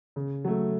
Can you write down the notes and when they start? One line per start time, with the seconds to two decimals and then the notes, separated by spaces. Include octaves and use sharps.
0.16 C#3
0.45 F#3 A3